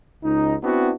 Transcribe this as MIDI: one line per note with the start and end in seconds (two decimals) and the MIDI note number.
0.24 0.56 37
0.24 0.56 63
0.64 0.92 59
0.64 0.92 60
0.64 0.92 62
0.64 0.92 64
0.64 0.92 66